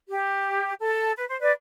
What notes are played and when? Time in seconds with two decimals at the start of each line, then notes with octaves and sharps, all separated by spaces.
0.09 G4
0.80 A4
1.16 B4
1.28 C5
1.40 B4 D5